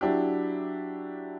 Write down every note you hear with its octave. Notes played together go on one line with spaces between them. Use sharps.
F#3 D4 E4 G4